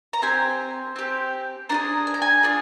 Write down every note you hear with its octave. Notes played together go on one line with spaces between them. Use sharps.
A#5
C4 G4 G#5
C4 G4
D4 F4 G#4 A#5
G#5
A#5
G#5
D4 F4 G#4